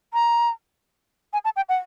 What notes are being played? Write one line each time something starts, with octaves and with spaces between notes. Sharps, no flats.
A#5
G#5
A5
G5
F#5